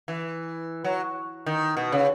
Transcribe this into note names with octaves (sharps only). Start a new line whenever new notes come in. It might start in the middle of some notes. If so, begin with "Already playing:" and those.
E3
F#3
D#3
B2
C#3